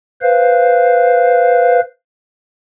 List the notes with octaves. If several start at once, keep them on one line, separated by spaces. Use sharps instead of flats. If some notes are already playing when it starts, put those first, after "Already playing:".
B4 C5 F5